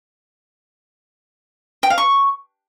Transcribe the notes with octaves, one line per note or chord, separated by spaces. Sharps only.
G5
F5
C#6